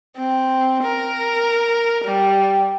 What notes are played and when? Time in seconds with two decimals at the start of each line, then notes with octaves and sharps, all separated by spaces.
0.17 C4
0.83 A#4
2.04 G3